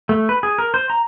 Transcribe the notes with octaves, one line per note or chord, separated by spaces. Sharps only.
A3
B4
G#4
A#4
C5
A#5